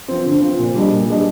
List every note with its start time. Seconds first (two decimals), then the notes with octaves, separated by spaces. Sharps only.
0.08 F3 C4
0.25 D3
0.41 F3 C4
0.58 A#2
0.75 G3 D4 G#4 D#5
0.92 A#2
1.08 G3 D4 G#4 D#5